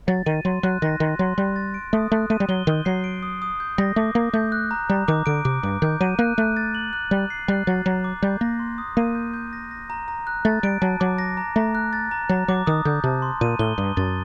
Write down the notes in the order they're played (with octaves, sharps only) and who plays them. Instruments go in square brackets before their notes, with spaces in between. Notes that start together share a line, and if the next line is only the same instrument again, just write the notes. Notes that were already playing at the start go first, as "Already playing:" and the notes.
[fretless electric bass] F#3 [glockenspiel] A6
[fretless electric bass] D#3 [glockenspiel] D#7
[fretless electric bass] F#3 [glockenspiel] C6
[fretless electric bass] F#3 [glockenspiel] F#6
[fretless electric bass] D#3 [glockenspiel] A#6
[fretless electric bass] D#3 [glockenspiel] C6
[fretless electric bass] F#3 [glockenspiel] C6
[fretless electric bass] G3 [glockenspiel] F#6
[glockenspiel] A6
D7
[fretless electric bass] A3 [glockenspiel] D#6
[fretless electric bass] A3 [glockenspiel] F#6
[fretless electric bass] A3 [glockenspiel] D#7
[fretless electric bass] G3
[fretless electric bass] F#3 [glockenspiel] G7
[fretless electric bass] D#3 [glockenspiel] G6
[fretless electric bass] F#3 [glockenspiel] C7
[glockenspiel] D7
D#6
D#6
G6
[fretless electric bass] G3 [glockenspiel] A#6
[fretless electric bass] A3 [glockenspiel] D6
[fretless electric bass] A#3 [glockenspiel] D6
[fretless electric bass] A3 [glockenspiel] G6
[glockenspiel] F#6
A#5
[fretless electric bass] G3 [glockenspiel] A#5
[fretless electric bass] D#3 [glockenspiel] D6
[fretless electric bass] D3 [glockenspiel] D7
[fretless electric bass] C3 [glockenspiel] D6
[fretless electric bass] G2 [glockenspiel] D6
[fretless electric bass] D#3 [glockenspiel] G6
[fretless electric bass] F#3 [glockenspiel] D#7
[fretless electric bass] A#3 [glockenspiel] F#6
[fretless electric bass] A3 [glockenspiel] F#6
[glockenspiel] A6
F#7
F#6
[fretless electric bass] G3 [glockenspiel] F#6
[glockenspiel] C7
[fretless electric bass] G3 [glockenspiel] F#6
[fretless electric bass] F#3 [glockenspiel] A6
[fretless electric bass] F#3 [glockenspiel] A#5
[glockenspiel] D6
[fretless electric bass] G3 [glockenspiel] G6
[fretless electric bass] A#3 [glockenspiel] A#6
[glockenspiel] C6
D#6
[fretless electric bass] A#3 [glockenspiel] D#7
[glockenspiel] G6
G6
A#6
A#6
A#5
A#5
F#6
[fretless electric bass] A3 [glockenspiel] A6
[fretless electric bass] G3 [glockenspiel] D7
[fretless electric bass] F#3 [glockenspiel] A5
[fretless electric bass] F#3 [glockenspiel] D6
[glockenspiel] A#6
A#5
[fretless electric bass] A3 [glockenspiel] A#5
[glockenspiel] F#6
A6
A#5
[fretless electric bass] F#3 [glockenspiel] A#5
[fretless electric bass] F#3 [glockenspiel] D6
[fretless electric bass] D#3 [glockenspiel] D#6
[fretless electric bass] D3 [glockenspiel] G6
[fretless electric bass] C3 [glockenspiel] A5
[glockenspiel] C6
[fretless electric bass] A#2 [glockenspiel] D#7
[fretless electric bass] A2 [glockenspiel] G7
[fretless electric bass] G2 [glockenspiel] D#6
[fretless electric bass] F#2 [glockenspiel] A6